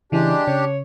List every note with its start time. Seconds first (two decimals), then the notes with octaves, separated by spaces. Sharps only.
0.12 C#3 E3 G#3 D4 G4
0.47 C#3 C#5